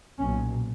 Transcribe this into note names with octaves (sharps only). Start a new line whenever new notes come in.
B1 A#2 C#4